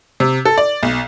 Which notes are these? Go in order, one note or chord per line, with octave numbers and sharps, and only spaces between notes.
C3
A4
D5
B1